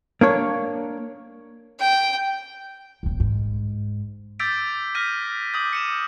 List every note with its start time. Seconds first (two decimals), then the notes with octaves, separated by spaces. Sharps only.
0.21 A#3 D4 C#5
1.80 G5
3.03 D1 A#1
3.20 G#2
4.40 D6 E6 G6 A6 B6 D7
4.95 F6 G6 A#6 B6 D#7
5.54 D6 D#6 G6
5.73 C#7 D#7 E7